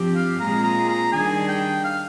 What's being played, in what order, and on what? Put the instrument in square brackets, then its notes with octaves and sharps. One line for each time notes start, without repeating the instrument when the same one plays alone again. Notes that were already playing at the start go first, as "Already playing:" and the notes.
Already playing: [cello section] G2 F3 C4 G4
[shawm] F5
[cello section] A#2 G#3 C4 F4 G#4 [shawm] A#5
[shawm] A#5
A#5
[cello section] D#3 G3 D4 G#4 [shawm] G#5
[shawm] G5
F5